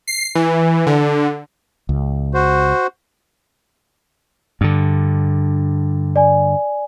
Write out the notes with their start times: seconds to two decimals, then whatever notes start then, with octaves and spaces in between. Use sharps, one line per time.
0.07 C7
0.35 E3
0.87 D3
1.89 C#2
2.34 F#4 C5
4.61 G2 D3
6.16 D5 G#5